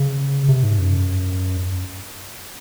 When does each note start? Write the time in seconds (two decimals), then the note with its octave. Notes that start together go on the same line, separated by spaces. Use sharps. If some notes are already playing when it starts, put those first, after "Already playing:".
Already playing: C#3
0.49 C3
0.63 G#2
0.78 F#2